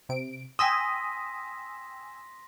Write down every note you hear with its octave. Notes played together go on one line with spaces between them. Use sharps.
C3 D7
G5 G#5 C6 D#6 E6 A#6 B6